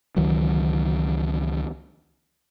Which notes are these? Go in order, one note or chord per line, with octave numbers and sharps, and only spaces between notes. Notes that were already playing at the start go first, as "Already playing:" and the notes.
C#2 D#3 E3 F#3